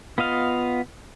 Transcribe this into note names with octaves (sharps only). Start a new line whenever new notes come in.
B3 F4 D#5 F5